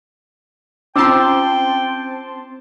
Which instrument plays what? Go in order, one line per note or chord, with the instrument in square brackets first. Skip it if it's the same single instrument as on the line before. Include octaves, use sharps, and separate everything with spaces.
[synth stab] C4 A5 C6 [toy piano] C#4 F4 [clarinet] G5 [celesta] D6 E6